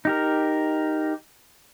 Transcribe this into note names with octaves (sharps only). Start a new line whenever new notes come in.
D#4 G4 A#4